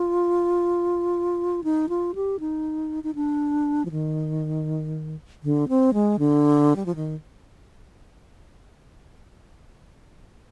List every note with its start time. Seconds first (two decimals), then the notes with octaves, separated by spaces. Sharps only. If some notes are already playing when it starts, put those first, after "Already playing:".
Already playing: F4
1.64 D#4
1.89 F4
2.15 G4
2.40 D#4
3.04 D#4
3.15 D4
3.85 F3
3.91 D#3
5.43 D3
5.68 C4
5.93 G#3
6.19 D3
6.76 G3
6.86 F3
6.96 D#3